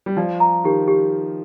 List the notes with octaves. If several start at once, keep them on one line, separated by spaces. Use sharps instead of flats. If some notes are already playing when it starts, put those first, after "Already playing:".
G3
F3 D5
A#5
D#3 G4
G4